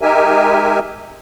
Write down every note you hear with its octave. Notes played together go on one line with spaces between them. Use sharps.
G#3 D#4 G4 A#4 E5 G#5